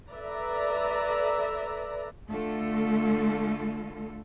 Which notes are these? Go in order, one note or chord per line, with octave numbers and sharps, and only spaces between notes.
A4 B4 D5 E5 A#5
D3 A3 F4 A4